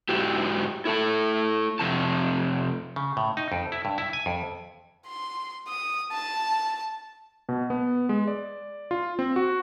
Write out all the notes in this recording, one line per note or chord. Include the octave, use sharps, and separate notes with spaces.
G#2 E4 F#4 G4
E4 A4 A5
F2 C3 A5
C#3
A2
D#4
F2
E4
G2
E4
G#5
F2
C6
D#6
A5
B2
B3
G#3
D5
F4
C4
F#4